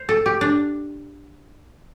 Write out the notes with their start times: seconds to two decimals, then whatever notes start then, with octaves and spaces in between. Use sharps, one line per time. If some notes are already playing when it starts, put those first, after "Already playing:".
Already playing: C5
0.09 A4
0.26 G4
0.41 D4